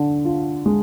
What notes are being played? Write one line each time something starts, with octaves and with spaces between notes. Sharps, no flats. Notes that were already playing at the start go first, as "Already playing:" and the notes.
Already playing: D3
F4
G#3